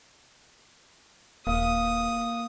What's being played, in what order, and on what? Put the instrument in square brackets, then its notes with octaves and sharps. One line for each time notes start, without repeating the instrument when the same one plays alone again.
[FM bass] D#1 [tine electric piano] A#3 [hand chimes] F5 [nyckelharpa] D#6